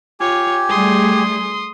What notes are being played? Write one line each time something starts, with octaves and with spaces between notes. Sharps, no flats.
F4 G4 C#5 G#5
G3 A3 G#4 C6 D#6